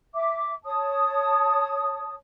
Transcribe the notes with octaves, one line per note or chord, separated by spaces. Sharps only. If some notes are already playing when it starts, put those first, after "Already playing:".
E5 D6
C#5 A5 D#6